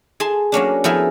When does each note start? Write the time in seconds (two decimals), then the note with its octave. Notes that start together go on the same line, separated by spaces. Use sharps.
0.20 G#4 A5 C6
0.52 F#3 A#3 C#4 D4
0.84 F3 B3 E4 G#4 A#4